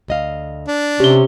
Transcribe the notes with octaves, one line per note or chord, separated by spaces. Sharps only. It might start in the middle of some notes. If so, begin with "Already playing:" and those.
D2 D#5 F5
D4
C3 C#4 G4 G7